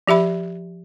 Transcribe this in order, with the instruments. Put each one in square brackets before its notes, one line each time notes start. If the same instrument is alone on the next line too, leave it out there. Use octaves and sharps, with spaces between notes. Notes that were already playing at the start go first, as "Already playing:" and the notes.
[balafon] F3 G4 E5 B5